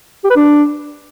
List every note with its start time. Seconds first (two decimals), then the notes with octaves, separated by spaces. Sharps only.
0.24 G4
0.30 B4
0.36 D4